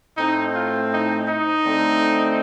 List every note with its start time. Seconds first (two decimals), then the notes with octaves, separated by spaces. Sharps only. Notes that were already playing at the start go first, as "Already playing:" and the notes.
0.17 A2 A3 C4 D#4
0.55 F4
0.92 D#4
1.28 D#4
1.65 D3 A3 C4